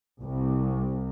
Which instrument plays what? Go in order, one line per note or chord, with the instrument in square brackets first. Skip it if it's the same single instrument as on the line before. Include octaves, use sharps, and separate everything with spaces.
[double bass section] C2